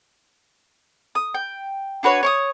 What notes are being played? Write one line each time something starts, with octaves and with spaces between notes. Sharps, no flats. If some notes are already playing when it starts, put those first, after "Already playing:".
D#6
G5
D4 F#4 B4 C#5
C#5 C#6 D#6